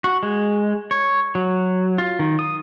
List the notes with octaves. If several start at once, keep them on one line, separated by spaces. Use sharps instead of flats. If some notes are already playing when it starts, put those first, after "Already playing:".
F#4
G#3
C#5
F#3
F4
D#3
D#6